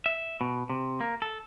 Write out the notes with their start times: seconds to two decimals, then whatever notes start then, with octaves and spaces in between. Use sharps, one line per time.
0.06 E5
0.41 B2
0.70 C3
1.01 A#3
1.22 A4